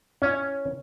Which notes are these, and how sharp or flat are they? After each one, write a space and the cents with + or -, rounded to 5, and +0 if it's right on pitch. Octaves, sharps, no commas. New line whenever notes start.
C#4 +0 E4 +5